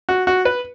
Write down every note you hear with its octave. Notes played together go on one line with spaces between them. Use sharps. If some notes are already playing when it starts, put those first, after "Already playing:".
F#4
F#4
B4